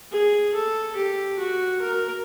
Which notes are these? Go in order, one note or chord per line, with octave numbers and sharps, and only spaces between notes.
G#4
A4
G4
F#4
A#4